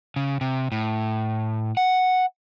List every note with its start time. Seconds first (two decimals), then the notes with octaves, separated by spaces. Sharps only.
0.16 C#3
0.41 C3
0.72 A2
1.77 F#5